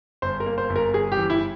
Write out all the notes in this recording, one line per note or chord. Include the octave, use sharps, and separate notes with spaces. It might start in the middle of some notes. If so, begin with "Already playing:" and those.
G1 C5
A#4
A#3
C5
G1
A#4
G1 G#4
G4
E3
E4